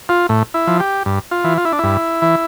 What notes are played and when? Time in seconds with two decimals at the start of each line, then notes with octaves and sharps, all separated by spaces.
0.09 F4
0.29 A2
0.54 E4
0.67 F3
0.80 G4
1.06 G2
1.31 F4
1.44 E3
1.58 F4
1.65 E4
1.72 D4
1.79 G2 E4
2.22 E3